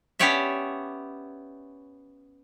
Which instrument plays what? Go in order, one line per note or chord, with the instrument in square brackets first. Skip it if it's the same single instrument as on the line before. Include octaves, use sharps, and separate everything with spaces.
[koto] B3 C#4 G4 C#5 D5 E5